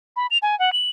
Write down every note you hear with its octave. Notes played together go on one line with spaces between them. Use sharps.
B5
F7
G#5
F#5
F#7